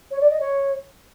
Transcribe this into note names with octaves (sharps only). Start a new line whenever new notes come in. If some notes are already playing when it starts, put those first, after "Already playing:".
C#5
D5
D#5
C#5